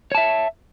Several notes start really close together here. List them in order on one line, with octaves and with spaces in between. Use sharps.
C#5 A5 E5